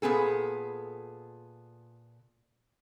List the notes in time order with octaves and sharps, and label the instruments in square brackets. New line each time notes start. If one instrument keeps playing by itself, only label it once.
[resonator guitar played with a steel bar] A#2 B3 G#4 A4